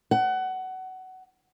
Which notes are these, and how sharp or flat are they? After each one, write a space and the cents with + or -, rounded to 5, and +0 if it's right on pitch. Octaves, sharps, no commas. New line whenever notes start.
F#5 +20